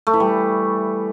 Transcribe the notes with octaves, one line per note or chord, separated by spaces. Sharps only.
A3
E3
G3